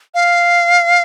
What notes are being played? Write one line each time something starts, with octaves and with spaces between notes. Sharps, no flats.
F5